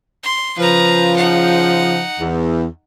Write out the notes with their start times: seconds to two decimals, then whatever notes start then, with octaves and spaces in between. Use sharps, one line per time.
0.23 C6
0.58 C#3 F3 B4 A#5
1.16 D#4 F#5
2.20 E2